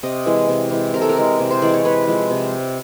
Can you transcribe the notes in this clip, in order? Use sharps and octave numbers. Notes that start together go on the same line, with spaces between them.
C3 D#5
E3 G#3
C3
E3 G#3
C3 A#4
A4
A#4
E3 G#3
C3
C5
E3 G#3 D5
C#5
C3 B4
F3 G#3
C3